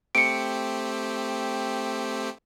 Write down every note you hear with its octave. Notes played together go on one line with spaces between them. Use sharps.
A3 C4 G4 C#7 D7